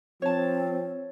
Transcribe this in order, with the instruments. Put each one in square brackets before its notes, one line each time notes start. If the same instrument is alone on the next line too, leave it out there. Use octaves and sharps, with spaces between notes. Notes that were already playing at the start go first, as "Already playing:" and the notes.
[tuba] F3 [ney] C4 [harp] C#5 A5